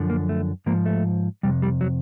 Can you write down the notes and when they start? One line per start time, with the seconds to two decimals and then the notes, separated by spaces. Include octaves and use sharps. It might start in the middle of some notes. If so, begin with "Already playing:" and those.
Already playing: F#2 D3 F3
0.10 A#3
0.29 A3
0.66 G#2 F3 A#3
0.86 A3
1.43 F2 C3 G3
1.62 G3
1.81 F#3